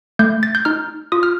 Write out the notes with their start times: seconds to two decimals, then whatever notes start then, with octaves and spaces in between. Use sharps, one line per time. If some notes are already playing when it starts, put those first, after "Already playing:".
0.19 A3 G6
0.43 A6
0.55 G6
0.65 D#4 F6
1.12 F4 D#6
1.23 F6